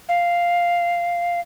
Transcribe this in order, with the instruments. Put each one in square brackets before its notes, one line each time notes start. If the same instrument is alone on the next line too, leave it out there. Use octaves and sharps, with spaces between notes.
[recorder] F5